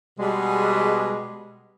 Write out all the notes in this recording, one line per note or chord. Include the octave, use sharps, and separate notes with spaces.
B2 G3 G#3